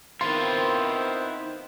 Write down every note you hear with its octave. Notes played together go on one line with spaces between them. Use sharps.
D#3 B3 C4 E4 F4 C5 C6